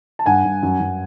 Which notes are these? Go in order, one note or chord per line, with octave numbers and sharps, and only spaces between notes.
A5
G2 F#5 G#5
G2
F#2
F#2